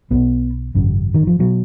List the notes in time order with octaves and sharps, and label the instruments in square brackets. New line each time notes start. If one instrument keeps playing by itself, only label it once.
[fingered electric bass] B1 B2 B3
G#1 F#2 C#3
D#3
F3
B2 F#3